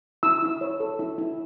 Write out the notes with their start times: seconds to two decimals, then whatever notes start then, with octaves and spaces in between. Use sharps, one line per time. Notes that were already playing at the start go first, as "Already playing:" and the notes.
0.23 E4 E6
0.42 E4
0.61 C#5
0.80 A4
0.99 E4
1.18 E4